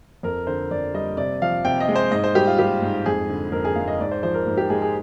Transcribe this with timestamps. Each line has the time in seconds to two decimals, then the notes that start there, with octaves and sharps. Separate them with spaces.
0.23 F2 A#4
0.47 D3 C5
0.71 F2 D5
0.94 G3 D#5
1.17 C3 D5
1.42 F3 F5
1.65 C3 G5
1.80 D#5
1.89 G#3
1.96 C5
2.11 G#2 D#5
2.24 C5
2.35 G3 G4
2.47 F4
2.59 G3 G4
2.82 G#2
3.06 F2 G#4
3.30 D3
3.52 F2 A#4
3.65 G#4
3.76 G#3 F5
3.88 D#5
4.00 G#2 D5
4.11 C5
4.23 F3 C5
4.34 A#4
4.46 G#2
4.57 G4
4.70 G#3 G#4
4.82 G#4